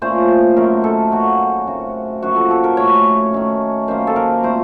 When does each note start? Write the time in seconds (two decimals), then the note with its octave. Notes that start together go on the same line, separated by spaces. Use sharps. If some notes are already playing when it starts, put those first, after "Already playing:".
0.02 A#2 A3 C#4 C5
0.56 F#2 D#3 A3 A#4
0.84 A4
1.11 D#3 F#3 A#3 C#4 F#4
1.67 C#3 A3 C4 F#4
2.22 F#2 F3 A#3 F#4
2.36 A4
2.51 A4
2.64 A#4
2.77 A2 A3 C#4 C#5
3.33 D#3 A3 C#4
3.88 F#2 D#3 A#3 C#4 C5
4.07 A4
4.16 A#4
4.43 A#2 A3 C4 C5